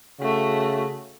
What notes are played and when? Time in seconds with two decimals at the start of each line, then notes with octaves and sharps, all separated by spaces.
0.20 C#3 A3 F#4